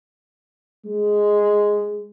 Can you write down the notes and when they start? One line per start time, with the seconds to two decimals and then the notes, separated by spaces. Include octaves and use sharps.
0.85 G#3